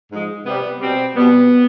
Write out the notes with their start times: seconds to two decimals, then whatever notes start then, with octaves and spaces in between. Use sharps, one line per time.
0.10 G#2 F3 G#3
0.45 C3 G3 B3
0.80 B2 G3 C4
1.15 B2 G3 B3